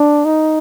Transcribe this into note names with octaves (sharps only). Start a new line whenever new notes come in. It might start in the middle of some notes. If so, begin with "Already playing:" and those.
Already playing: D4
D#4